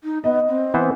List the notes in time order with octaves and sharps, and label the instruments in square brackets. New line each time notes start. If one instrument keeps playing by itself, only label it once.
[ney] D#4
[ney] B3 [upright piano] D#5
[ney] C4
[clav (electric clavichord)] E3 B3 C5